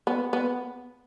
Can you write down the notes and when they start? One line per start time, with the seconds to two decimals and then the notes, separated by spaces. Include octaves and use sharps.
0.07 B3
0.33 B3